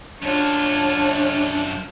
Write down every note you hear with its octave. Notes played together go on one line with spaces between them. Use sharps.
F#2 D4 F4 C#5 A5